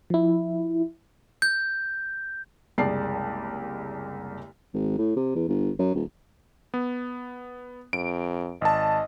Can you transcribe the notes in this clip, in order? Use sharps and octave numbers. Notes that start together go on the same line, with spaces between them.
F3 E4
G6
F#1 C2 G#3 D5 A5 C7
G#1
A2
C3
E2
G1
F#2
D#1
B3
F2 D7
G#1 D#5 A5